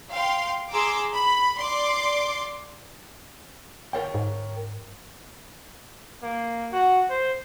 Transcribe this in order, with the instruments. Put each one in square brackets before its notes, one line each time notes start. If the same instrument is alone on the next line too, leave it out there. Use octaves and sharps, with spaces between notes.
[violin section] F5 G5 C6
G#4 A#5 C6 D6 E6
B5
D5 C6 D6
[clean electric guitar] A#4 C#5 G5
[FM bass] G#2
[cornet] A#3
F#4
C5